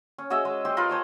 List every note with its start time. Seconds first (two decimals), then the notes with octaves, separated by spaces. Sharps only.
0.18 C#4
0.30 F#4 G#4 D#5 E5
0.45 G#3
0.65 G4 C5 D#5
0.77 F4 A#4 B4 D#5
0.89 C5 C#5 A5